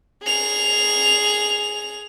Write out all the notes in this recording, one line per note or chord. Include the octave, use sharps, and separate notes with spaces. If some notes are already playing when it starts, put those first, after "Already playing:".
G#4 F7